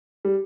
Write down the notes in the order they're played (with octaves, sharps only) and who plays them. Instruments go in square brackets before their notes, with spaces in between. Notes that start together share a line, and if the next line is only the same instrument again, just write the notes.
[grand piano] G3